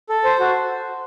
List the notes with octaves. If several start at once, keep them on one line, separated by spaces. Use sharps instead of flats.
A4
C5
F#4